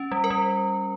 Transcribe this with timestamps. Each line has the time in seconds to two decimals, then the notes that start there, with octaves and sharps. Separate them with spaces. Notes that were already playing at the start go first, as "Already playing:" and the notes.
Already playing: C#4
0.12 G3
0.24 A#4
0.30 G3